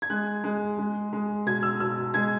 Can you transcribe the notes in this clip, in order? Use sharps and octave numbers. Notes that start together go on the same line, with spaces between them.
G#6
G#3 F#6
G#3
G#3
G#3
B2 G#6
E6
B2 E6
G#3 G#6